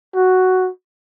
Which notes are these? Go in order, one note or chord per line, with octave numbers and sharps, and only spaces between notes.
F#4